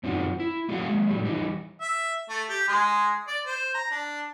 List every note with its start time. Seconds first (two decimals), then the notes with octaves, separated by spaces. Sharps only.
0.03 F#2 C4 D#4 F4 F#4
0.40 E4
0.69 A3 F#4 G#4 D5 F5 F#5
0.88 G#3 A#3
1.07 A2 F#3 G3
1.25 E3 G3 D#4
1.81 E5
2.29 A3
2.49 G4
2.68 G#3
3.28 D5
3.46 C5
3.75 A#5
3.91 D4